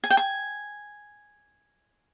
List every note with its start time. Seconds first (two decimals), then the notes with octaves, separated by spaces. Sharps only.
0.04 G#5
0.10 G5
0.17 G#5